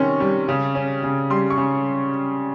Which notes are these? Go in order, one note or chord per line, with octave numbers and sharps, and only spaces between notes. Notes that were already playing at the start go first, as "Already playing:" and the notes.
Already playing: C3 D#3 C#4 C6 C#6
G3
C#3
C#4
C#3
G3 C6
C#6
C#3